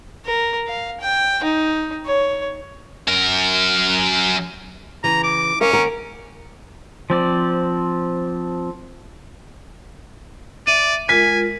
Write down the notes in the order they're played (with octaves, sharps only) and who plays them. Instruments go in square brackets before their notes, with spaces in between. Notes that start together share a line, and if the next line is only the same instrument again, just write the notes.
[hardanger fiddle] A#4
F5
G5
D#4
C#5
[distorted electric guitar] F#2 A#4
[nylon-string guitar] C#3 E3 [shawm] A#5
[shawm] D6
[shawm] C#4 [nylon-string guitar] A#4 F5
[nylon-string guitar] D#2 A#4 F#5
[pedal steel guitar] F3 C4 D5
[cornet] D5 [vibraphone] E5 [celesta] D#7
[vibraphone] G#3 F4 A#4 [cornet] G#5 [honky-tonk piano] B6